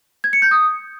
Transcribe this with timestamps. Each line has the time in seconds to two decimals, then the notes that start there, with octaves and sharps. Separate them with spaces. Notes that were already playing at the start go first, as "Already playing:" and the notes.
0.24 G#6
0.33 C#7
0.42 G6
0.51 D#6